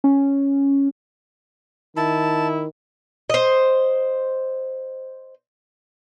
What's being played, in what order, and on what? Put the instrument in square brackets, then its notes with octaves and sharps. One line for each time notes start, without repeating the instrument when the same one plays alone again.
[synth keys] C#4
[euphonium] D#3 [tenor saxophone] E4 [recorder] A5
[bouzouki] C5 D#5